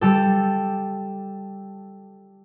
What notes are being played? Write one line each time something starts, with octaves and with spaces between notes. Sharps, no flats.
G3 G4 A4